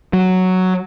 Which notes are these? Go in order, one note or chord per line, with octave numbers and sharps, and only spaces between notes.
F#3